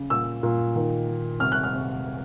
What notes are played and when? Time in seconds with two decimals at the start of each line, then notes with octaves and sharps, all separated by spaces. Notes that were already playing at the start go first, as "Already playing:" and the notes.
Already playing: C#3
0.10 A#2 E6
0.43 A#2
0.76 D#3
1.08 D#3
1.40 C3 F6
1.52 F#6
1.63 F6
1.73 C3